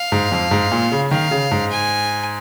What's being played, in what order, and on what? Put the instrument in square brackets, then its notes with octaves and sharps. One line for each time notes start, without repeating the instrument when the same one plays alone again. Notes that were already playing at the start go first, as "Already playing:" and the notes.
Already playing: [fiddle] F5
[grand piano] G#2
F2
G#2
A#2
C#3
[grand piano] D#3 [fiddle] F5
[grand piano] C#3
G#2
[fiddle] G#5